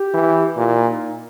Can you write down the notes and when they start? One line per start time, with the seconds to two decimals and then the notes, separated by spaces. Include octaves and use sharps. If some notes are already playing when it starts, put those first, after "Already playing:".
Already playing: G4
0.14 E3
0.57 A#2 E4
0.77 E4
0.86 D#4